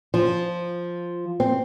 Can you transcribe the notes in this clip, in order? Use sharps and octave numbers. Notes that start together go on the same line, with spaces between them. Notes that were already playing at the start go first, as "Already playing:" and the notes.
F3
C4